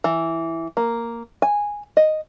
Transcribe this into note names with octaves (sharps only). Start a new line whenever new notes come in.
E3
A#3
G#5
D#5